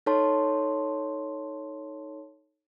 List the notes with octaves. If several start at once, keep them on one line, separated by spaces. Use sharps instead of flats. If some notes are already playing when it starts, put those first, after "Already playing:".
D#4 A4 C#5 A5 C6